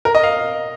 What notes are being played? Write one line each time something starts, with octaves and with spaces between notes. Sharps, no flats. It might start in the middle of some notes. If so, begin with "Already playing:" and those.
A#4
D#5
F5